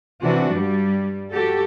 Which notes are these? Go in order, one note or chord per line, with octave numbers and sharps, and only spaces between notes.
C3 E3 D4 F#4
G2 G3
F#4 G4 A4